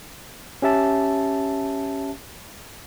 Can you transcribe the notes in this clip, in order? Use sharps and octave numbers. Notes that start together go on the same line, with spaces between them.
C#4 G4 E5 A5